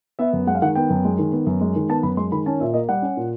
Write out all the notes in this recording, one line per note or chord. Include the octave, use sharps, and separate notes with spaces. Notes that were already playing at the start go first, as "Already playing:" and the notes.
B3 E5
F#2
G#3 F#5
F5
D#3 F#5
B3 G5
F#2
G#3
D#3
B3
F#2
G#3
D#3
B3 A5
F#2 B5
G#3 C6
D#3 B5
C#4 A5
A#2 E5
A#3 D#5
G3 F#5
C#4
A#2